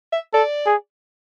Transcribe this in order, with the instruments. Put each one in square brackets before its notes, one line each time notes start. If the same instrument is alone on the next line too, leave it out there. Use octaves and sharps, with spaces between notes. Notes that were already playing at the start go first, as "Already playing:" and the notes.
[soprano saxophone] E5
[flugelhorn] A4 [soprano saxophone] D5
[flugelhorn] G#4